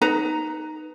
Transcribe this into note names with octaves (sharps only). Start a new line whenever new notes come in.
D#4 B4 A#5